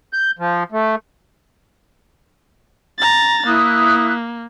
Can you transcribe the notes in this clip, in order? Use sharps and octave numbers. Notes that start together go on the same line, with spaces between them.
G6
F3
A3
A#5 A6
A#3 E4 D#6 F#6